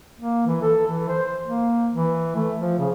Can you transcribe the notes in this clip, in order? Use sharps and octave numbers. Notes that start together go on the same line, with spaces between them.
A#3
E3
A4
E3
C5
A#3
E3
A3
F3
C#3